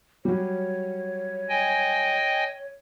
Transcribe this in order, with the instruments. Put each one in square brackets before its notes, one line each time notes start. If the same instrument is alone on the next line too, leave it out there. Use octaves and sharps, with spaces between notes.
[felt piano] F#3 G3 [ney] C#5
[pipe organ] D#5 G5 G#5